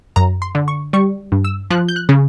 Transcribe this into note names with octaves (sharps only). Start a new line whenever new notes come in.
F#2 A#5
C6
D3
C#6
G3 C#6
G2
E6
F3 F#6
G6
F#6
C#3